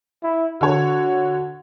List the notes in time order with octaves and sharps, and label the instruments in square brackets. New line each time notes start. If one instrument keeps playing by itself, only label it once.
[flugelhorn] E4
[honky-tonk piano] D3 C#5 [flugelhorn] F#4